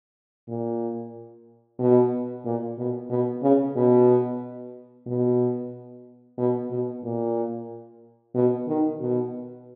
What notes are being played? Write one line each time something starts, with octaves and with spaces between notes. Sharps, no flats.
A#2
B2
A#2
B2
B2
C#3
B2
B2
B2
B2
A#2
B2
D#3
B2